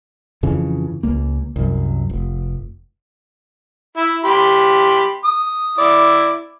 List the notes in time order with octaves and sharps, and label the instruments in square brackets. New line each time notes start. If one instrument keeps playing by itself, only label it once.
[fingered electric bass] F2 C#3 E3 F3
C#2 A#3
C2 F#2
F1
[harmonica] E4
G4 B5 C6
D#6
E4 D5